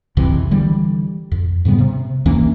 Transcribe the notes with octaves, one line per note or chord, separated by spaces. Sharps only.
C2 F2 C3 E3
D3 E3 G3
F2
G#2 C#3 G3 B3
C3
D#2 E3 A#3 C#4